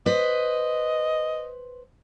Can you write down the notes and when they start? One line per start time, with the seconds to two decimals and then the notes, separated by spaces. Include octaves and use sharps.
0.06 B4 C5 D#5